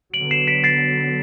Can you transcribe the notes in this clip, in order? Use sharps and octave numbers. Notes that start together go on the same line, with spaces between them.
D3 F#3 B3 D7 F#7
C7 E7
B6 D7
A6 C7